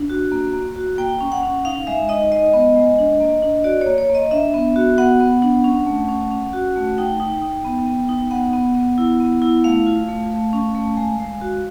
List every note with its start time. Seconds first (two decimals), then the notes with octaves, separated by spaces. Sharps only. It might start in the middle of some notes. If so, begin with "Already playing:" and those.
Already playing: D4
0.10 F#4
0.32 A#3
0.54 A#3
0.76 F#4
0.98 A#3 G5
1.21 C#4
1.32 F#5
1.43 C#4
1.65 D#4 F5
1.87 G#3 E5
2.09 D#4 D#5
2.32 G#3 D#5
2.54 B3
2.76 G#3
2.98 D4
3.20 A#3
3.42 D4
3.64 F#4 D5
3.81 C#5
3.87 A#3
3.98 C#5
4.10 A#3 D#5
4.31 D4 E5
4.54 B3
4.76 F#4
4.98 B3 F#5
5.20 B3
5.42 D4
5.64 C#4
5.86 A3
6.09 C#4
6.31 C#4
6.53 F#4
6.76 A3
6.98 D#4 G5
7.20 D#4
7.42 D#4
7.64 B3
7.86 B3
8.09 D#4
8.31 B3 F#5
8.53 B3
8.75 B3
8.98 E4
9.20 B3
9.42 E4
9.64 A3 F5
9.87 F4
10.08 A3
10.31 A3
10.53 C#4
10.75 A3
10.97 G#3
11.20 G#3
11.41 F#4